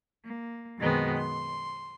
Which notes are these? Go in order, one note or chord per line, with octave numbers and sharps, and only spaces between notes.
A#3
F#2 B2 D#3 G#3 B3 C4
C6